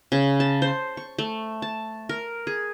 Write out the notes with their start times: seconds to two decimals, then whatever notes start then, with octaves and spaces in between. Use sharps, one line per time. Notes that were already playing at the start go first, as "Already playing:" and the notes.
0.12 C#3
0.40 A5
0.62 C5
0.97 C#6
1.18 A3
1.62 A5
2.09 A#4
2.47 G#4